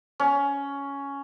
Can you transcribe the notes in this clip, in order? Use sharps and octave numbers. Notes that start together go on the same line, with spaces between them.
C#4